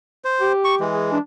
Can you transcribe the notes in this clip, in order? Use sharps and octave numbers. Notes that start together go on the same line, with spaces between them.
C5
G4
C#6
E3 G#3
G#4
D4